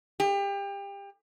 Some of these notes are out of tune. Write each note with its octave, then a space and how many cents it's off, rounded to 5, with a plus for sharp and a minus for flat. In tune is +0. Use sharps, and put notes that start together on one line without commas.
G4 +30